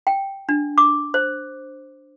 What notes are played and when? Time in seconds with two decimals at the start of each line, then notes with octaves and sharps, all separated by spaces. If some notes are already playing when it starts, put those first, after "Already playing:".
0.07 G5
0.49 D4
0.78 D6
1.14 C5